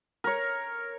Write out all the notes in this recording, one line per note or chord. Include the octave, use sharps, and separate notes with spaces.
A#4 C#5